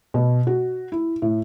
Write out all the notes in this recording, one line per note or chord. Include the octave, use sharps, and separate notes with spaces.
B2
F#4
E4
A2